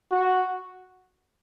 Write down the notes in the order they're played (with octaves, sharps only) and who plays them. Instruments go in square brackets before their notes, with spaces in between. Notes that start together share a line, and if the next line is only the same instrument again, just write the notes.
[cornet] F#4